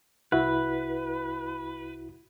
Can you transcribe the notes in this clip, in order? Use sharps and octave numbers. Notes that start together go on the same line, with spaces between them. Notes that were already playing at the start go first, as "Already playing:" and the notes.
C2 E4 F#4 B4